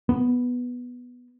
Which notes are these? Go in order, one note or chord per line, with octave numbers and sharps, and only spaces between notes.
B3